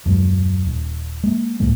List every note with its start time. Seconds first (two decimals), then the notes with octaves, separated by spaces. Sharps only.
0.06 D#1 F#2 F#3 G#3
0.67 D#1
1.24 G#3 A#3
1.60 C#2 A2 G#3 A#3